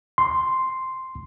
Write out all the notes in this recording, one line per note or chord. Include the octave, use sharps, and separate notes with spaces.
C6